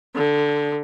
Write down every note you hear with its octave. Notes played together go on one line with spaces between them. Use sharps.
D3